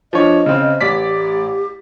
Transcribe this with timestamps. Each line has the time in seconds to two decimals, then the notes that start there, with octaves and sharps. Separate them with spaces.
0.13 F3 D4 C#5 D#5
0.46 C#3 C4
0.81 A1 G4 D5 B6